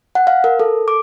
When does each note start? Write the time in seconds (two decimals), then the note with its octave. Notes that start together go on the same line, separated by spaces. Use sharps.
0.15 F#5
0.27 F5
0.44 A#4
0.60 A4
0.88 D6